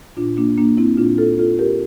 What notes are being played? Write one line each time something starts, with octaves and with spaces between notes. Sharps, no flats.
A#2 D4 F4
A#3 D4
A#3 D4
C4 E4
A#2 D4 F4
F4 A4
F4 A4
G4 A#4